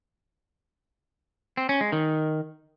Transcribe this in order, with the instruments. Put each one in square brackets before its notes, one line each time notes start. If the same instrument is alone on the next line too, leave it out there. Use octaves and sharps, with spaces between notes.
[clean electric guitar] C4
C#4
G#3
D#3